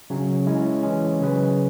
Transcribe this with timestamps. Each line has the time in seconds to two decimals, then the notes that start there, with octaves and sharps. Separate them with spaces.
0.10 C#3 F#3 C#4
0.46 G#3 C#4 E4
0.83 E3 G#3 C#4
1.19 C#3 F#3 C#4 G#4 B4